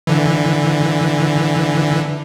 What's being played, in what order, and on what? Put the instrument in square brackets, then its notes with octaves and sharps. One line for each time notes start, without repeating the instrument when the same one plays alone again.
[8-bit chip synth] D3 E3